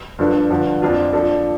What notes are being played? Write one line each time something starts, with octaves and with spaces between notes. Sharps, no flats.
G2 F3 D4 A4
G2 D3 F3
F2 F3 D4 F4
F3 D4 A4